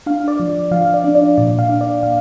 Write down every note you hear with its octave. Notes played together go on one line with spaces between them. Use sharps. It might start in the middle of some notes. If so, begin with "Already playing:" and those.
D4 F5
D5
F3
F3 F5
D5
D4
D5
A#2 D5
F5
D4
D5
A#2 F5